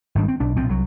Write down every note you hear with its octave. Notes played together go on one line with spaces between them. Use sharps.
G#1 G#2 G3 D4
C4
B1 D4
B1 A#2 F3 C4
C2 F#3